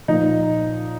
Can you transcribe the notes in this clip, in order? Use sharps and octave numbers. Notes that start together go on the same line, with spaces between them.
A#2 F3 D#4